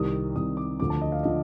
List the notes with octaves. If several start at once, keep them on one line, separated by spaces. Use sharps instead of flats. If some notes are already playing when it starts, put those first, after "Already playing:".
Already playing: C2 C3 D#3 D#6
C2 C3 D#3 D#6
D6
D2 D3 F3 D6
A5
D#5
F5
D3 F3 D#5